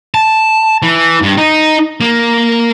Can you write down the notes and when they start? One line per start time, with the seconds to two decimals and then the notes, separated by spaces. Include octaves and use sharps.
0.14 A5
0.83 E3
1.22 G2
1.38 D#4
2.01 A#3